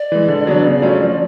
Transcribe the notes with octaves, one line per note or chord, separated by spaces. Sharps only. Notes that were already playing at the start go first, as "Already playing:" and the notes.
Already playing: D5
E3 G#3
D3
F#3 B3 D4
C#3
F#3 A3 C#4 F4
F3